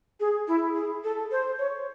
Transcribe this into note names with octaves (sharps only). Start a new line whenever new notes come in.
G#4
E4
G#4
A4
C5
C#5